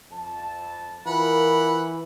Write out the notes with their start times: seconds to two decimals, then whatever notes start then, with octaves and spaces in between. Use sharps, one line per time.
0.11 F2 A5
1.07 E3 F4 A#4 F#5 B5